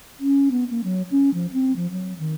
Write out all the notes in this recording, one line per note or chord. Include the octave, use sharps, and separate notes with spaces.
C#4
B3
A#3
F#3
C#4
F3
C4
F3
F#3
D#3